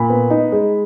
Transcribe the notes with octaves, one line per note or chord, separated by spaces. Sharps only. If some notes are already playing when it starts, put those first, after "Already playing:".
Already playing: A#2 B5
B3
D#4
G#3